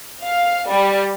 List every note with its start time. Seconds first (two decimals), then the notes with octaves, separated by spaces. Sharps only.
0.23 F5
0.70 G3